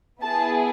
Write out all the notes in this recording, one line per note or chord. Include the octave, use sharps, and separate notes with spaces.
B3 E4 G#4 A5